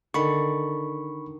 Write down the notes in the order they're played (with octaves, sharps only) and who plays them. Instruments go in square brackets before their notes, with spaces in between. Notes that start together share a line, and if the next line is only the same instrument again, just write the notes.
[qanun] D3 D#3 [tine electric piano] B5 C#6